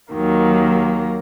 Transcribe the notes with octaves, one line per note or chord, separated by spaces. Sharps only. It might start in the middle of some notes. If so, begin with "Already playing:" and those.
D#2 D#3 F#3 A#3